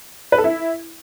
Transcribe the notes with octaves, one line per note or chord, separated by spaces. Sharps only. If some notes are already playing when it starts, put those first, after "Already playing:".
B4
A4
E4